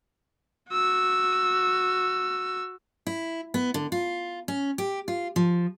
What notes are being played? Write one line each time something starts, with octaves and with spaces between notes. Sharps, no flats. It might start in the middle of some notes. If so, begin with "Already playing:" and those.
F#4 E6
E4
B3
D3
F4
C#4
G4
F4
F3